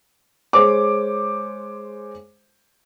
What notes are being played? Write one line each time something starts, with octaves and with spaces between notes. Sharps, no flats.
G#3 C5 C#5 D6